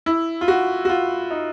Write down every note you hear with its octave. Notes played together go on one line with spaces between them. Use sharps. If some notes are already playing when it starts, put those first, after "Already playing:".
E4
F4
F#4
F#4
F4
D#4